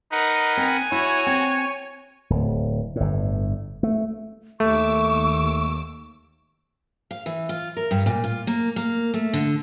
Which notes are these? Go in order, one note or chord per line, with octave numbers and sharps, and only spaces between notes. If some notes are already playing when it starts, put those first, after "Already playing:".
D#4 A#4 B4 F#5
C4 G#5
E4 F#4 C#5
C4
D1
G1 A2
A3
D#2 A3 C#6 D6 E6
F5
E3
F4
A#4
G2
A#2
F4
A#3
A#3
A3
D3